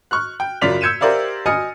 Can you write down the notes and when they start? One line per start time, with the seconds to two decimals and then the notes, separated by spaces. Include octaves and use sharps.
0.11 C#6 F6 F#6
0.40 G5
0.62 F#2 C#3 F4 D5 B6 F7
0.81 E6 G6 G#6 C#7 D#7 E7
1.01 G4 A#4 C5 D5 E5 F5
1.46 D#5 G#5 D#6 F6 A6 C#7